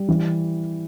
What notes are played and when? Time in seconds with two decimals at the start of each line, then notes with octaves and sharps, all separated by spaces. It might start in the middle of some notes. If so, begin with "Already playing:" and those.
Already playing: G3
0.09 E3